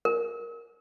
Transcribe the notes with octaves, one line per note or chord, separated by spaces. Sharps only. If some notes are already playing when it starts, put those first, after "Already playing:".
A#4